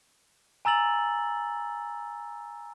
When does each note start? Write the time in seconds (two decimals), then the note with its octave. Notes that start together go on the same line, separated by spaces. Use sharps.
0.65 G#5 A#5 E6 A6 F#7